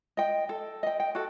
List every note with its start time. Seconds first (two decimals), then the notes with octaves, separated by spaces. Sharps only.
0.17 D#5 G5
0.49 A4
0.83 D#5 G5
1.00 G5
1.15 F#4 A4